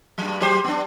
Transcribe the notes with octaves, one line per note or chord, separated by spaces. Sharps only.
G2 F#3
F#3 G4 C5
B3 D4